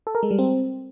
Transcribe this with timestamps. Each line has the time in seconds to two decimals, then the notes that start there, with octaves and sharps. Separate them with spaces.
0.07 A4
0.15 A#4
0.23 G#3
0.31 G3
0.39 C4